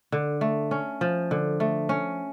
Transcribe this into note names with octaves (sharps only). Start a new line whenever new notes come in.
D3
A3
C#4
F3
D3
A3
C#4